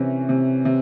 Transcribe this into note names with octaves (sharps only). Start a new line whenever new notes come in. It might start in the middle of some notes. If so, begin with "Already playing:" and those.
Already playing: C3 E3 C#4
C3
C3